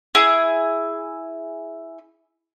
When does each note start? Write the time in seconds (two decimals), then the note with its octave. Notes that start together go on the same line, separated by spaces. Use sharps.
0.15 E4 G#4